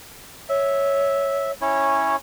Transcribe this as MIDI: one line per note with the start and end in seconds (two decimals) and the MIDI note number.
0.49 1.52 73
0.49 1.51 76
1.61 2.16 61
1.61 2.16 64
1.61 2.16 73